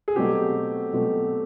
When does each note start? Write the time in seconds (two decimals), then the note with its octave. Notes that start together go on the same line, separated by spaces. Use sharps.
0.08 G#4
0.16 B2 F#3 A3 C4 G4
0.93 B2 F#3 A3 C4